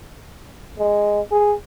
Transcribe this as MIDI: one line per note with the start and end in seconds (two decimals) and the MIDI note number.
0.78 1.20 56
1.31 1.53 68